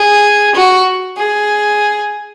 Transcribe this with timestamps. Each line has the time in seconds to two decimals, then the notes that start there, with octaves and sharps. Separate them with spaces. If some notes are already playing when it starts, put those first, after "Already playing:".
Already playing: G#4
0.55 F#4
1.17 G#4